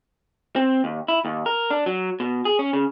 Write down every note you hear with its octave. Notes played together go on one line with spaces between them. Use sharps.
C4
D#2
E4
D#2
A#4
D4
F#3
B2
G#4
C#4
C#3